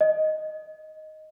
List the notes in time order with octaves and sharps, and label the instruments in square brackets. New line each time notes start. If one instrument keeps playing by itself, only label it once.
[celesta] D#5